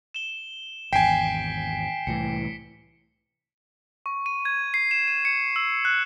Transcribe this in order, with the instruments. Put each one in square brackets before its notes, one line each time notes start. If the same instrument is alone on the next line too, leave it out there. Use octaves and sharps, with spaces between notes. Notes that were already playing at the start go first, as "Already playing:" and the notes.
[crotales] E7 G7
[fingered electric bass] G#1 E2 [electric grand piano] G5 G#5 [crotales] B6 C7 D7
[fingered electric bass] C2 A2 E3 [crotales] C#7
[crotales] C#6
D#7
G#6
C7
E7
D#7
C#7
E6
F#6